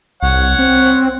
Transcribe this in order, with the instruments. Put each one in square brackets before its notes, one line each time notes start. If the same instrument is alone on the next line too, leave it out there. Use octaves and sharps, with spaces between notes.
[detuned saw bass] C2 [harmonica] C#5 F#5
[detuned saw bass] C4